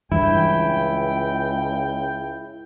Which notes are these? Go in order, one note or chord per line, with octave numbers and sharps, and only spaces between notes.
C#2 G2 E3 E4 G5